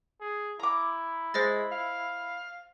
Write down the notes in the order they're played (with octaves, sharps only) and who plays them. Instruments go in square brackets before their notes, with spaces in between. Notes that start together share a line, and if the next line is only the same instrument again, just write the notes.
[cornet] G#4
[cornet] E4 [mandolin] A#5 D6
[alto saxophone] G#3 [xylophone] C5 D#5 A6
[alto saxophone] F5